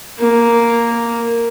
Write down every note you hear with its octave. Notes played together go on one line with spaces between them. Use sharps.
A#3